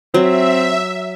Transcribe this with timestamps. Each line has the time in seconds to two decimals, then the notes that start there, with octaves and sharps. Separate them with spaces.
0.14 F#3 C4 E5